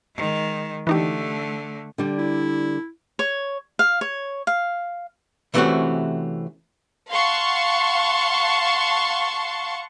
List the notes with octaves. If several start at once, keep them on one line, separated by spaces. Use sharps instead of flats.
D#3 G#3
D3 E3 A3 D#4 G4
D3 G3
E4
C#5
F5
C#5
F5
C3 E3 A3 C4 C#4 F#4
F5 F#5 A5 C6 C#6